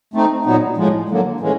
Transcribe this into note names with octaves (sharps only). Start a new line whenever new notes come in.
A3 C4 D#4
A#2 F#3 B3 D#4
A2 F3 G#3
D3 F#3 A#3
A2 E3 G#3 C#4